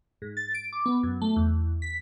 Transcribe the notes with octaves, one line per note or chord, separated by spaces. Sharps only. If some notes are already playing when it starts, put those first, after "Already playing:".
G#2
A6
D7
D6
B3
F#2
A3
E2
B6